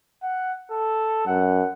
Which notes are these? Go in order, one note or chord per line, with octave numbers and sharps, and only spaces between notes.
F#5
A4
F#2 F#5